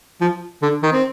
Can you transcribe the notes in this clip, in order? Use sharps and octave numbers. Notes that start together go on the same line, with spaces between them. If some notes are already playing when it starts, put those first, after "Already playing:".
F3
D3
D#3
C4